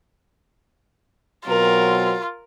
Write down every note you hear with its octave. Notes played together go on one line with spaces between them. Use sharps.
B2 F#3 C4 F4 A#4